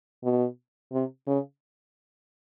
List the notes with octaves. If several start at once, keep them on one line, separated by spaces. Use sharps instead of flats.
B2
C3
C#3